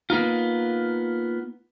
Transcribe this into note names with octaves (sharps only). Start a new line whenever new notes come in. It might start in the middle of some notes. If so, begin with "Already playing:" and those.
A#3 B3 D#4 F4